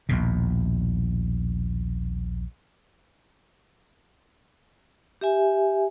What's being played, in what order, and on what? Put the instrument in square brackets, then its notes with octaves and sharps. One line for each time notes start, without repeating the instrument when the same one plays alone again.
[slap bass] A#1 D#2 B2
[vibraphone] G4 E5 G#5